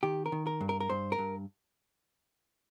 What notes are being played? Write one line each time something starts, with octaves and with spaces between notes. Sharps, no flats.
D#3 G4
A#4
D#3
A#4
G2
A#4
A#4
G2 C5
A#4
G2